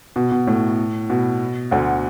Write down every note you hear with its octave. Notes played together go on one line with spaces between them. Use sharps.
B2
B2
A2
B2
D2 D3